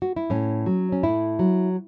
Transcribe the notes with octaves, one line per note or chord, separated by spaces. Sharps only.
F#4
E4
A2 C#4
F#3
C#4
A2 E4
F#3